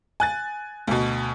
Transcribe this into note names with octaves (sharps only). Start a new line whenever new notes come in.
G#5 F#6 A6
D2 B2